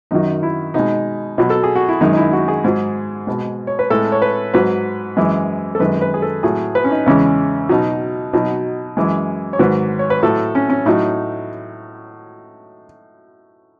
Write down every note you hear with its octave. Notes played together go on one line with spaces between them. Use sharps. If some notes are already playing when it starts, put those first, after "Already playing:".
F#2 D#3 F#3 D#4
E4
B2 G#3 D#4
B2 F#3
A4
G#4
F#4
E4
F#2 D#3 G#3 D#4
D#4
E4
F#4
G#4
G#2 F#3
B2 G#3
C#5
B4
A2 G#3 A4
C#5
B4
G#2 F#3 B4
F#2 E3 G#3
A4
F#2 D#3 G#3 B4
B4
G#4
A4
A2 F#3 G#4
B4
C#4
D#4
E2 C#3 E3 G#3 C#4
B2 F#3 D#4
B2 F#3 D#4
F#2 E3 G#3
C#5
G#2 D#3 F#3 B4
C#5
B4
A2 F#3 A4
C#4
C#4
A2 F#3 D#4